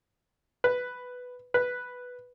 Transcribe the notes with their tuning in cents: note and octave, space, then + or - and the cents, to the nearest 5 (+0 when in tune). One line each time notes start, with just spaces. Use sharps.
B4 +5
B4 +0